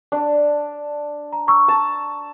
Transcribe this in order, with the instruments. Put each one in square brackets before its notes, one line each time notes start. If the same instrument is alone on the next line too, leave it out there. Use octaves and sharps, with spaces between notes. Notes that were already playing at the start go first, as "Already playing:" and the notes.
[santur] D4
[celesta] A#5
A#5 C#6 E6
[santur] A5